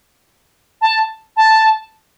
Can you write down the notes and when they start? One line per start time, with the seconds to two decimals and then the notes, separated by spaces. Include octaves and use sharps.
0.81 A5
1.36 A5